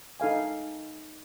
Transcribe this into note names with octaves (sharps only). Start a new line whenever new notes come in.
D#4 A4 F5 G#5